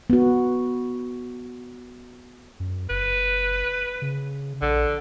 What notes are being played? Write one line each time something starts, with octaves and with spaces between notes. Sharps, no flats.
B3 F#4
F#2
F#1 B4
C#3
A#1 D3